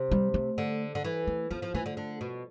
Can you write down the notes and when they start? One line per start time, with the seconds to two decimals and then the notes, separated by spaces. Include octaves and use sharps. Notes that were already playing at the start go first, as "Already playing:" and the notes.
Already playing: C3
0.11 G3
0.34 A3
0.58 D3
0.95 D3
1.04 E3
1.27 A3
1.51 F3 B3
1.62 F3
1.74 E3 A3
1.86 D3
1.97 D3
2.21 B2